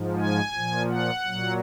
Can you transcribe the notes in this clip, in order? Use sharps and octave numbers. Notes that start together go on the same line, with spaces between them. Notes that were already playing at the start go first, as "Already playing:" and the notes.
Already playing: G#2 F3
G#5
A#2 F3
F#5
A#2 F#3